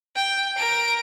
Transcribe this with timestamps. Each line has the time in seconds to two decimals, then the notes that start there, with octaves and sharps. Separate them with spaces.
0.16 G5
0.57 A#4 D7